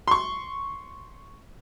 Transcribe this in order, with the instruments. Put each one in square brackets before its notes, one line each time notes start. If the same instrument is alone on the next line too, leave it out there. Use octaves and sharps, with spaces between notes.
[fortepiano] C6 C#6